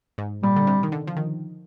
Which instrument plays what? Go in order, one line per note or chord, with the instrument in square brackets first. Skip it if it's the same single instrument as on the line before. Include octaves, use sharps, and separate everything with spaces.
[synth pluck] G#2
[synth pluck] A#2 [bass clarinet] G3
[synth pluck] D3
C3
D#3
D3
F3
D#3